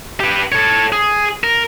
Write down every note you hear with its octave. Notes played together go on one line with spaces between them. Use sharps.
G4 B4
A4 C#5
G#4
A#4